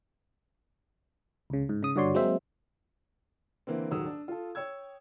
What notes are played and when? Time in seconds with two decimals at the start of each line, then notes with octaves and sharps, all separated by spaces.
1.50 C#2 C#3
1.69 G#2
1.83 C#3 D#6
1.96 G2 D3 F#4 C#5 D5 C6
2.14 F#3 G#3 A#3 C4 C5 E5
3.67 D3 E3 A#3 C4
3.91 D#1 G#2 D#3 F#3 D#6 E6
4.06 D4
4.28 F4 A4
4.55 C#5 G5 E6 G#6